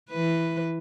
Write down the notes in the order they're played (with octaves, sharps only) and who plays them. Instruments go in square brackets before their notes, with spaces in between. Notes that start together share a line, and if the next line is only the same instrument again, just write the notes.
[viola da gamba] E3 B4